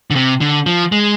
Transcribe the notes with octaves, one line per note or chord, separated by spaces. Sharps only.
D3
C3
D3
F3
G#3